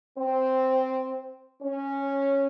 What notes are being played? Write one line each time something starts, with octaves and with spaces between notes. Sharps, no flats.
C4
C#4